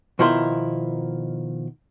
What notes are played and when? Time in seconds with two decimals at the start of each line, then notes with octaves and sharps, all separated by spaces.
0.19 B2 D#3 F3 E4 A#4 C6